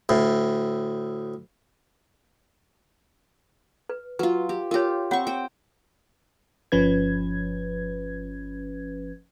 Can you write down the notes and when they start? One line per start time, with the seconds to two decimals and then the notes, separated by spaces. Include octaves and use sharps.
0.09 D2 A2
3.89 B4
4.19 F#3 F4 B4
4.49 G4
4.71 F4 G4 A#4 C#5
5.11 C4 F4 C#5 F#5 C#6
5.27 C5 G5
6.72 G1 F3 C#4 B4 G#6